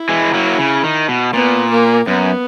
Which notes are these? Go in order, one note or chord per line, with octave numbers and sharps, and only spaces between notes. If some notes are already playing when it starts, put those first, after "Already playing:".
Already playing: E4
E3 G#3
F#3 A#3
C#3
D#3
B2
A#2 B3
A#3
F#2 B3